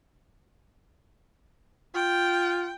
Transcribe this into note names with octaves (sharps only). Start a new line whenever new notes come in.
F4 G5